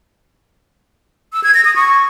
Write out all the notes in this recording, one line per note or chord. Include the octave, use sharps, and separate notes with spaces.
E6
G#6
A#6
D#6
C#6